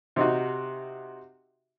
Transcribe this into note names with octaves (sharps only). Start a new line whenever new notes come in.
C3 D#4 F#4